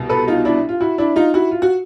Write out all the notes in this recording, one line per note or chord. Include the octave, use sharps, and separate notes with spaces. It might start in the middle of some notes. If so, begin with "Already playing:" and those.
Already playing: C2 B2
A4 B4
D#4 F4
D4 E4
F4
E4 F#4
D4 E4
D#4 F4
E4 F#4
F4
F#4